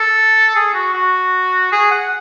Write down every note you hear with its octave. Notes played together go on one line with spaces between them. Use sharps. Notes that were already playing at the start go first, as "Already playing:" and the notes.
Already playing: A4
G#4
F#4
F#4
G#4
F#5